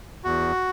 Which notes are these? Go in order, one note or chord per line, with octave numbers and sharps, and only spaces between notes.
E2 F#4